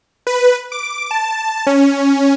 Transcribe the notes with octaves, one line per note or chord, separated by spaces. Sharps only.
B4
D6
A5
C#4